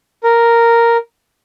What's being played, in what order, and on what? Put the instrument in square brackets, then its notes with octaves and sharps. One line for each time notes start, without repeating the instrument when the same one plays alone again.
[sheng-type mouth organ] A#4